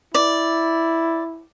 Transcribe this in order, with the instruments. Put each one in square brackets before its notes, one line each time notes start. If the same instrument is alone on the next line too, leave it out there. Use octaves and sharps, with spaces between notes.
[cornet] E4 [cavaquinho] D5